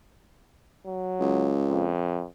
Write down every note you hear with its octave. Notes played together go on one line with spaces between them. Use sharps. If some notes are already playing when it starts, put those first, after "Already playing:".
F#3
C#2
F2